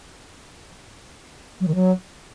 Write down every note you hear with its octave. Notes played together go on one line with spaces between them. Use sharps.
F#3
D#3
F#3